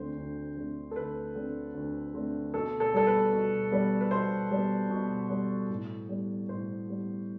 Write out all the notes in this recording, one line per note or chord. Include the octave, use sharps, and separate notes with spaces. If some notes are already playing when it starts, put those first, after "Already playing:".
Already playing: D2 D3 A3 C4 C5
D2
D3 A3 C4
A4
D2 B4
D3 A3 C4
D2
D3 A3 C4
B2 A4
A4
G3 B3 A4
B4
B2
G3 B3
B4
B2 C5
G3 B3
B2
G3 B3
A2
G3 B3
A2 C5
G3 B3